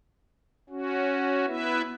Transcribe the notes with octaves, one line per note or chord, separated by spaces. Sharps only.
C#4 F#4
B3 E4 B4 E5